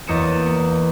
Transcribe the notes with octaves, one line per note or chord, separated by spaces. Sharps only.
E2 A#3 D#5 A6 C#7 E7